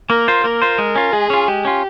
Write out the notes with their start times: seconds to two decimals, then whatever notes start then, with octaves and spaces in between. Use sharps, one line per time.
0.10 A#3 A#4
0.28 F4 C5
0.44 A#3 A#4
0.62 F4 C5
0.78 G#3
0.96 C#4 F4
1.13 G#3 G#4
1.30 C#4 F4
1.48 G#3 G4
1.65 C#4 F4